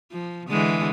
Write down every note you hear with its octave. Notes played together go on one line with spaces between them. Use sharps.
F3
D3 E3 G#3